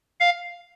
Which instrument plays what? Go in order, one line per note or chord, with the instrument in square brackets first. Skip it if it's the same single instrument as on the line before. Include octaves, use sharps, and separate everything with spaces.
[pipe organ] F5